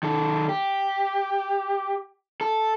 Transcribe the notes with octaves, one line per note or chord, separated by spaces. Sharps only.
D#3 A4
G4
A4